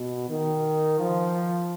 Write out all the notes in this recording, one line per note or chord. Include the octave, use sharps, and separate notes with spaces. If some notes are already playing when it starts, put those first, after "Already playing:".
Already playing: B2
D#3
F3